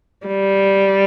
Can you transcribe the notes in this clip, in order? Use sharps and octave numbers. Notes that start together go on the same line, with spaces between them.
G3